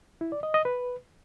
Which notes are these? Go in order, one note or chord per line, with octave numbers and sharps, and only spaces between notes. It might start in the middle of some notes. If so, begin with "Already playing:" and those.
E4
D5
D#5
D#5
B4